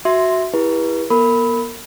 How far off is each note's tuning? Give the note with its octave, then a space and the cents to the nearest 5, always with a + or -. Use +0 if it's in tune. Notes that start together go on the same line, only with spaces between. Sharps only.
F#4 +0 E5 +0 C6 +0
E4 +0 G4 +40 B4 -35
B3 -40 A#4 -30 B5 +0